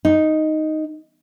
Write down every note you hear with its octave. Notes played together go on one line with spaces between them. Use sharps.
D#4